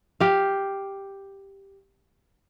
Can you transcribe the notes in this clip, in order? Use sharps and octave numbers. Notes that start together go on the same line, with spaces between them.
G4 F5